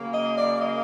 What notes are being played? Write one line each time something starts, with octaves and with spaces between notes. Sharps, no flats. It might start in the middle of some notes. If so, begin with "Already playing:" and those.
Already playing: C#3 F#3 A#3
D#5
D5
D#5